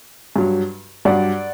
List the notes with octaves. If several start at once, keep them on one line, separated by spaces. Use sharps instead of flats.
G2 F#3
G2 F#3 D5 F#5